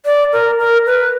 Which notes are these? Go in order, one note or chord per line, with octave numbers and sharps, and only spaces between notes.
D5
A#4
A#4
B4